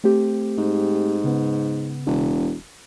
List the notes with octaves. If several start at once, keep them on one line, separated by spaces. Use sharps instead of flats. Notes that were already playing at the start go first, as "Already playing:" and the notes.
A3 C4 G4
G#2
C#3 B3
E1